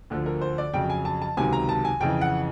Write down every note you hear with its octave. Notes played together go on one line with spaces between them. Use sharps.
D2 D3 F3
A#4
C5
D5
F2 C#3 F#3 G5
G#5
A5
A5
C#2 C3 D#3 F#3 G#5
A#5
A5
G#5
F2 C#3 E3 G5
F#5